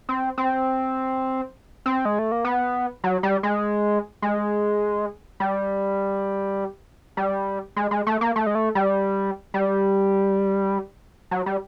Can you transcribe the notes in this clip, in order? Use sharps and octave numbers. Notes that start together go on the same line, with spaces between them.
C4
C4
C4
G#3
A3
A#3
B3
F#3
G3
G#3
G#3
G3
G3
G#3
G#3
A3
A#3
A3
G#3
A3
G3
G3
F#3
G3